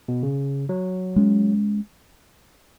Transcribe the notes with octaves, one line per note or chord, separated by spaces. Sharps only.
B2
C#3
F#3
G#3 C#4